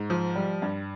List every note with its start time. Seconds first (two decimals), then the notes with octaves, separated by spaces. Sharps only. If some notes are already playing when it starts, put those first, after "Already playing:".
Already playing: G#2
0.10 F3
0.36 G3
0.62 G2